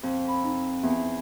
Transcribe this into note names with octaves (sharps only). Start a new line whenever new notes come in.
F2
B5
D#4
E2